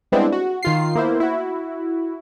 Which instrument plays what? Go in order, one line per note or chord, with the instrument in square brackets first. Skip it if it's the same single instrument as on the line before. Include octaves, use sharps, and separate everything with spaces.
[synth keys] G3 G#3 B3 C4 D4 E4
F#4
D#3 F4 C7
A#3 B3 E4 C5
E4 F#4